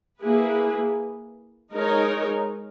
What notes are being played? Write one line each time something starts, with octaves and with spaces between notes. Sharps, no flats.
A#3 E4 G#4 B4
G#3 D#4 A#4 C#5